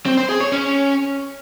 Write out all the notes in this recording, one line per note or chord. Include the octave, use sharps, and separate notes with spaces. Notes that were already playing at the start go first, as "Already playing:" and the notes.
C4
C5
G#4
C#5
C#4